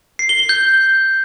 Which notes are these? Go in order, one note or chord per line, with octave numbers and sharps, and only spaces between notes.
C7
G7
G7
G6